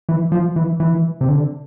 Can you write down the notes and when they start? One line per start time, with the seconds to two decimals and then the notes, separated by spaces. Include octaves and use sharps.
0.09 E3
0.32 F3
0.56 E3
0.80 E3
1.21 C3
1.28 D3